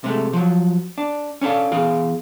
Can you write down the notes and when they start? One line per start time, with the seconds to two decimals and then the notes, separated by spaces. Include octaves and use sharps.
0.04 C3 G#3 A3
0.33 F3 F#3
0.98 D4
1.41 C#4 D4 E4 A4 F5
1.72 E2 G#4 F5